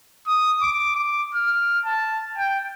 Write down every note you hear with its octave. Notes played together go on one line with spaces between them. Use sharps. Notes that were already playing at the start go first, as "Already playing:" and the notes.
D#6
D6
D6
F6
A5
G5